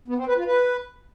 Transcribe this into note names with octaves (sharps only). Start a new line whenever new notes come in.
B3
C4
B4
F4
B4